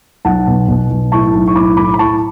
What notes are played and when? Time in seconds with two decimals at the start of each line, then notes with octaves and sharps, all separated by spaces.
0.25 B1 F#5 A5
0.47 B2
0.68 B2
0.90 B1
1.12 A2 A5 C#6
1.34 B1
1.48 C#6
1.55 A2 B5 D6
1.77 A2 B5 D6
1.94 B5
1.99 A2 A5 C#6